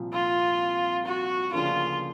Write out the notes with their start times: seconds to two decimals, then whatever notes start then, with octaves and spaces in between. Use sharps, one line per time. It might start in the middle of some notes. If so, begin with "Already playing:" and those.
Already playing: C2 A#2 F3
0.13 F4
1.06 F#4
1.52 D2 C#3 F3 A#3 D4 F4